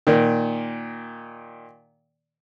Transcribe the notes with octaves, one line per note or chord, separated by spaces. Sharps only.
A#2 D#3